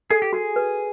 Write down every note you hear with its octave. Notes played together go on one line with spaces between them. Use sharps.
G#4 A4
G4
F#4 G#4
B4